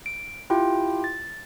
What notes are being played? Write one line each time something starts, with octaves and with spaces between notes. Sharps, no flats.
D7
E4 F4 G4 G5
A6